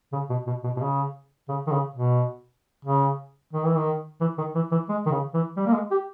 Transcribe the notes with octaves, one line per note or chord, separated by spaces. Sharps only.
C#3
B2
B2
B2
B2
C#3
C#3
D#3
C#3
B2
C#3
D#3
E3
D#3
E3
D#3
E3
E3
G#3
D#3
C#3
E3
G3
A#3
G#3
G4